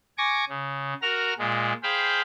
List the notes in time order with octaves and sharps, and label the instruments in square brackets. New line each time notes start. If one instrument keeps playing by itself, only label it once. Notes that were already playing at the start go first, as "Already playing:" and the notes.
[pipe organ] G#5 C#6 D6 A#6
C#3
F#4 A#4 A#5 F6
A#2 G#3
G#4 C5 F5 G5 B5